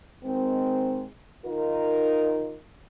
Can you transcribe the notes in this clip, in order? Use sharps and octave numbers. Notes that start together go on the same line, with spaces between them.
D#3 G#3 C4
D#3 D#4 F4 A#4